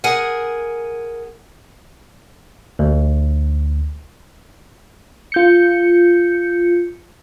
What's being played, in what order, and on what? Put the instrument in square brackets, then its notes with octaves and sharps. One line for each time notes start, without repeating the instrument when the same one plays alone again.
[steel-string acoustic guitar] G#4 A#4 F#5 G#5
[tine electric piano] D2
[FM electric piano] F4 G6 C#7